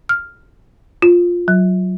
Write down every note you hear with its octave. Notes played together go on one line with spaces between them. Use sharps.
F6
F4
F#3